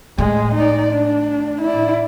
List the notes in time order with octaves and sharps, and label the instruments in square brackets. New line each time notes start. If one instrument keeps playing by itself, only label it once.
[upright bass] A2 [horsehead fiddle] G#3
[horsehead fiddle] D#4 D5
D4
E4 D5